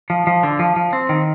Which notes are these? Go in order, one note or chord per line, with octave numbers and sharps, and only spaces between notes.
F3
F3
D3
F3
F3
C4
D#3